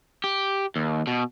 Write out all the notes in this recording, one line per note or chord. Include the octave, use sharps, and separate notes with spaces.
G4
D#2
B2